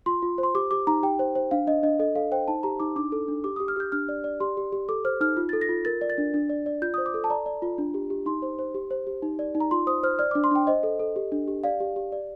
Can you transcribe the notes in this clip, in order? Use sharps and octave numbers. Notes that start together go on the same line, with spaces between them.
F4 C6
F4
C5
C6
G4 D6
G4 D6
D#4 A#5
G4 G5
C5
C5
D4 F5
D4 D#5
D4 D#5
A4 D#5
A4 F5
C5 G5
D#4 A5
G4 A#5
D#4 D6
D4 D6
A4
D4
G4 D6
G4 D#6
F6
G4 G6
D4 F6
D5
D5
G4 C6
G4
G4
A4 D6
C5 F6
D#4 F6
F4
A4 A6
A#6
F4
A#4 A6
D5
A6
D4
D4
D5
D5
F4 G6
C5 D#6
D6
A4
A5
D5 A#5
D5
F4
D4
G4
G4
D#4 C6
C5
C5
G4
C5
G4
D#4
D5
D#4
A#5
F4 C6
C5 D#6
C5 F6
D5 F6
D4 D6
C6
D4 G5
C5 D#5
A4
A4
G4
D4
G4
D5 F5
G4
G4
D5